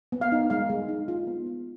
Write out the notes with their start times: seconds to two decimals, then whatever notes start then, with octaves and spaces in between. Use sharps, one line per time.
0.12 B3
0.21 F5
0.32 D#4
0.50 G#3 F5
0.70 G#3
0.89 D#4
1.08 F4
1.27 B3
1.46 F4